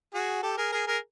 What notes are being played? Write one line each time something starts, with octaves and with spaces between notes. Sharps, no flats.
F#4 G#4
G4 A4
G#4 A#4
G#4 A#4
G#4 A#4